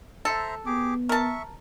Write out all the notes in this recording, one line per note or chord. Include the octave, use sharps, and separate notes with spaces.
A4 C5 E5 A#5
B3 G4 G#4 D6
A#4 E5 A5 C#6